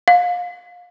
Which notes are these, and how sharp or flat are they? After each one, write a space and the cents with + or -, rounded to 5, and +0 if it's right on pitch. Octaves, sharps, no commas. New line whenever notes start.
F5 +25